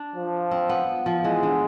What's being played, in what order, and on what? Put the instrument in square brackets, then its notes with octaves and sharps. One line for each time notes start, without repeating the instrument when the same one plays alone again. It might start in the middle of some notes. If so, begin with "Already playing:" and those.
Already playing: [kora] D4
[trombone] F3
[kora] C4
B3
F3
[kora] E3 [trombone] G#3
[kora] D3